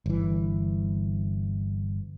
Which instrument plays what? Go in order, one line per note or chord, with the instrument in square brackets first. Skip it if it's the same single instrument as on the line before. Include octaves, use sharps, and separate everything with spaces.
[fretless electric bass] G1 E3